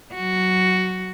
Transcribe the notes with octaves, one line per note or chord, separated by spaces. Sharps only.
F#3 F#4